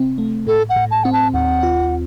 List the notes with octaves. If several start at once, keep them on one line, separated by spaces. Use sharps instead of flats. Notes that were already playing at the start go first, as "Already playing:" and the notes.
Already playing: C3 C4
A3
A2 A4
F#5
A2
A5
C4 F#5
A5
D#2 F#5
F4